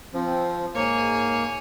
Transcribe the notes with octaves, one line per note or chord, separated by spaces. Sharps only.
F3 C4
G#2 A#3 C#5 G#5